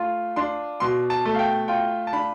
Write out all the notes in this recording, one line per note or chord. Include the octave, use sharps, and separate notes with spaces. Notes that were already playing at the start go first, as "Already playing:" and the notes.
Already playing: A3 F4
D4 C6
B2 C6
A5
A3
F5
G5
F4 G5
A5
D4 B5